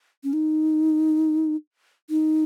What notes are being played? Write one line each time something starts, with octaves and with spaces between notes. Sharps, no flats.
C#4
D#4
D#4